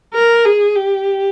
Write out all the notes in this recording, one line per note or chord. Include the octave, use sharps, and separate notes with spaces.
A#4
G#4
G4